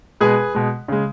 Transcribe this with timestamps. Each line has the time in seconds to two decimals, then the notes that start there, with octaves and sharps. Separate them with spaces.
0.20 B2 G#3 G#4 B4
0.55 B2 G#3
0.88 C#3 G#3